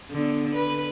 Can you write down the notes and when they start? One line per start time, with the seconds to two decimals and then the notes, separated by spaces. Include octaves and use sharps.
0.11 D3 B3
0.55 B4